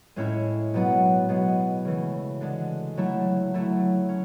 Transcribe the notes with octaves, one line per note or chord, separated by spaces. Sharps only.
A2 G#3 C#4 E4
B2 F#3 B3 F#4
B2 G#3 B3 F#4
C#3 E3 A3
D3 G#3 D4
F#3 A3 E4
F#3 A3 E4
C#4